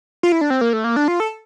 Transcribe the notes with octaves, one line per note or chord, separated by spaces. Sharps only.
F4
E4
D4
C4
A#3
A3
A#3
D4
F4
A4